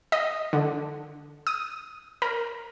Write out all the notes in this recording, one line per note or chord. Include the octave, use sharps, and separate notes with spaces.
D#5
D3
D#6
A#4